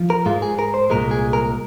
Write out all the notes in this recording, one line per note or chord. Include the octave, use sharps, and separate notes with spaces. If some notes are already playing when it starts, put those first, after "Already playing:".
Already playing: F3
A#4
G#2 G#3 F4
G#4
A#4
C5
C2 A#2 G#3 A#4
G#4
A#4